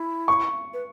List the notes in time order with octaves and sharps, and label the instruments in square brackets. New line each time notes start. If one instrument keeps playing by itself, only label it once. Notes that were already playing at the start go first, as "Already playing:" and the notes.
Already playing: [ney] E4
[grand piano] C#6
[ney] B4